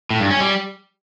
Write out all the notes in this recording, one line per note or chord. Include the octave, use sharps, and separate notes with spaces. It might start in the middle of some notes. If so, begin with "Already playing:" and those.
A2
G2
C#4
G3